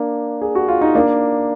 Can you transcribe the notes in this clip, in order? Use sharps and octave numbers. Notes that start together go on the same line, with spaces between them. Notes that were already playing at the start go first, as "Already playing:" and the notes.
Already playing: A#3 D4
G#4
F#4
F4
D#4
A#3 D4